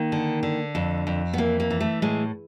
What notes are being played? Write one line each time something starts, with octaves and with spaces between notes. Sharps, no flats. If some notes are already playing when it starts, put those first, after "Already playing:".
Already playing: D#3 A#3
D3
D3
F2
F2
B3
E3 A#3
A#3
E3
A3
A2 G#3